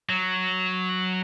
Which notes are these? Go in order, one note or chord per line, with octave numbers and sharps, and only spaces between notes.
F#3